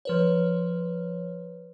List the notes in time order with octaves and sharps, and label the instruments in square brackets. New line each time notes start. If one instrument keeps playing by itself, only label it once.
[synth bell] F3 B4 C#5